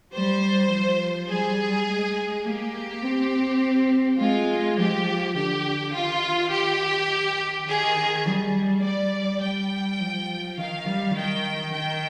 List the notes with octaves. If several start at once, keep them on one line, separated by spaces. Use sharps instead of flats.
G3 C5
F3
G3 G#4
G#3
A#3 G4
C4
G#3 F4
F3 G4
D3 G4
D#3 F4
G4
D#3 G#4
G3
G3 D5
G3 G5
F3
D#3 F5
G3
D#3 G5
D#3 G5